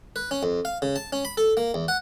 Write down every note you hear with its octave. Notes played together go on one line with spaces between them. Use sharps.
B4
C#4
F2
F5
C#3
A5
C#4
B5
A4
A#3
E2
F#5